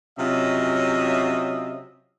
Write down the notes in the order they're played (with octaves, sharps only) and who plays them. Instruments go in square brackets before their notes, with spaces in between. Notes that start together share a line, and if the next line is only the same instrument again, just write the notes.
[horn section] C3 F#3 C#4 F4 D#5 E5